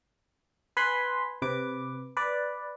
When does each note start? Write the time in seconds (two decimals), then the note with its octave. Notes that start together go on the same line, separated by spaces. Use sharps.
0.77 B4 G#5 B5 C6
1.42 C3 B4 D6
2.17 B4 D5